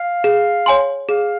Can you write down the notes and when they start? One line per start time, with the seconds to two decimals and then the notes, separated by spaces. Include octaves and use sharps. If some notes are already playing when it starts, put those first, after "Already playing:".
Already playing: F5
0.24 G#4
0.66 C#5 G#5 C6
1.08 G#4 F5